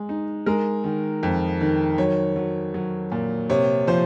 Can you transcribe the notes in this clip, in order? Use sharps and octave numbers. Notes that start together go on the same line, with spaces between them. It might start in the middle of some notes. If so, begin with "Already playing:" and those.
Already playing: G#3
D#4
G#3 A#4
D#3
F2
D#3
F#3 C#5
F#3
F#3
A#2
C3 C#5
F3 C5